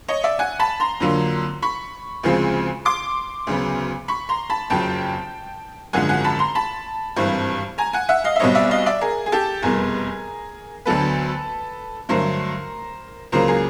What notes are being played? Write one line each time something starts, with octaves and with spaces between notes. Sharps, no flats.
C#5 D#5
D5 E5
F#5 G#5
A5 B5
A#5 C6
F2 D3 F#3 A#3
B5 C#6
D2 C#3 F3 G#3 C4
C6 D6
D2 C#3 F#3 B3
B5 C#6
A#5 C6
A5 B5
F#1 F2 C#3 F#3 G5 A5
G#1 F#2 D3 F3 G#3 F#5 G#5
F#5 G#5
A5 B5
A#5 C6
A5 B5
G#1 G2 E3 G3 C4
G#5 A#5
F#5 G#5
E5 F#5
D#5 F5
E5
B1 B2 G3 C4 C#5 D#5
D5 E5
D#5 F5
D5 E5
G#4 A#4
G#4
G4 A4
F1 E2 B2 G3 G#4 A#4
D2 D3 F#3 B3 A4 B4
G2 D3 F#3 A3 A#4 C5
C#2 C#3 F#3 A#3 A#4 C5
G#4 A#4